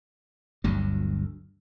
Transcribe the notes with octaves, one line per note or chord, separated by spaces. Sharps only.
G1 D2 G2 F#3